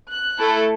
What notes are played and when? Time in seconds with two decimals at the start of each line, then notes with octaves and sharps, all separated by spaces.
0.10 F#6
0.39 A3 E4 A4